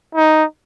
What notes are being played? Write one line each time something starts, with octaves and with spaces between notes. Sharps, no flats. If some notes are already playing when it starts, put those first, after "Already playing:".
D#4